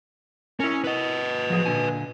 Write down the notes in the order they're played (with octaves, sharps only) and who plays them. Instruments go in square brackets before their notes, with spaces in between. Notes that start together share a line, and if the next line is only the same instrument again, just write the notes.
[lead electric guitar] C#4 [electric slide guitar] E4 A#4
[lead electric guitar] B4 D#5
[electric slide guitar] F3 F#3 G#4
A#2 D3 G#5